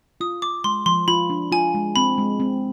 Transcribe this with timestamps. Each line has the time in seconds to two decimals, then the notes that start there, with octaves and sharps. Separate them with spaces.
0.21 F4 D#6
0.42 F4 D6
0.64 G#3 C6
0.86 F3 C6
1.08 F4 B5
1.30 D4
1.52 F4 G#5
1.74 G#3
1.96 C4 B5
2.18 G#3
2.40 C4